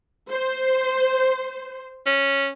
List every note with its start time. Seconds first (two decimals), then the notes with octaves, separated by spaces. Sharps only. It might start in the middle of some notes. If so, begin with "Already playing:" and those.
0.29 C5
2.06 C#4